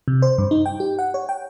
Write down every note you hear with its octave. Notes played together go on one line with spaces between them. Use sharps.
C3
C5
G2
D#4
G5
G4
F#5
C#5
G5